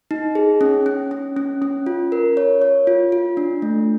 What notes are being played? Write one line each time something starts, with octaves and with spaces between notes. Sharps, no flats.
D#4
G#4
C#4
C#4
C#4
C#4
C#4
F4
A#4
C#5
C#5
F4
F4
D4
A3